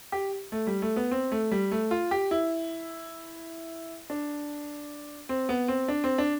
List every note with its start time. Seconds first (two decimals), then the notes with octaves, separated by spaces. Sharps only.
0.12 G4
0.52 A3
0.67 G3
0.82 A3
0.96 B3
1.11 C4
1.32 A3
1.51 G3
1.72 A3
1.91 F4
2.11 G4
2.31 E4
4.10 D4
5.29 C4
5.49 B3
5.68 C4
5.88 D4
6.04 C4
6.18 D4